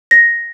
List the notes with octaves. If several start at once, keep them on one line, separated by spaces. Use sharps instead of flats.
A#6